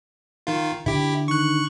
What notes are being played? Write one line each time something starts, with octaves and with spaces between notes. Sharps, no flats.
D#3 F4
D3 E4 G4
D#3 C#6 F#6